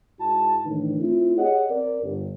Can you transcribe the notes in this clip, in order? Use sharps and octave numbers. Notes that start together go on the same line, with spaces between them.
G#2 E4 F#4 A5
A2 D#3 E3 A3 D4 D#4
A3 C4 E4 F4
G4 G#4 C#5 D#5 F#5
C4 A#4 D5
G1